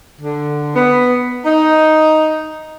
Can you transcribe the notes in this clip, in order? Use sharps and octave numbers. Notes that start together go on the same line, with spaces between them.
D3
B3
D#4